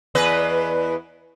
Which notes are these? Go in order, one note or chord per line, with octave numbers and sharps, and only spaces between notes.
E2 B4 D#5